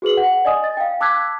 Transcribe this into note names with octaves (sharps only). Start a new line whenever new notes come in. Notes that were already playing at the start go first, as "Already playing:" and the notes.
F#4 G#4 B4 F#7
F#5
D5 D#5 G#5 D#6
A6
F5 G5
A5 D6 E6 F#6 G#6 B6